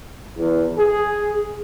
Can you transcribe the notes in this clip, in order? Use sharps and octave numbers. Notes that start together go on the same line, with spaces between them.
E2
G#4